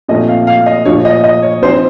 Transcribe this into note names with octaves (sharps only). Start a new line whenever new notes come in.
A#2 F3 A3 C4 D#5
F5
F5
D#5
A#2 F3 A3 C#5
D#5
D#5
C#5
F3 C4 D#4 C5